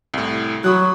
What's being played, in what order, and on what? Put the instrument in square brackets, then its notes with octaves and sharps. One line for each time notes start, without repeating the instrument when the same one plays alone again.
[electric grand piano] C2 A2
[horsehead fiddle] F#3 [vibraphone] F#4 C#6 [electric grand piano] B5 D#6 F#6